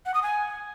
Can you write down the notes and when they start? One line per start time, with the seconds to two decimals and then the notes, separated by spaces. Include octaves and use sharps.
0.06 F#5
0.14 D#6
0.23 G#5